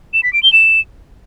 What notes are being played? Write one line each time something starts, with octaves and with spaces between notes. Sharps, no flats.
E7
B6
D7
G7
E7